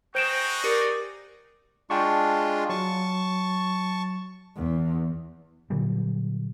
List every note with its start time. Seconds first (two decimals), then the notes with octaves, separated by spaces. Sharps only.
0.15 D#4 F#4 G#4 C5 G5 D7 E7
0.64 G4 A#4 D5 C#7
1.90 G#3 D4 F4 G5 A5 C#6
2.69 F#3 A5 C#6
4.56 E2
5.70 A#2 D3 F#3 G3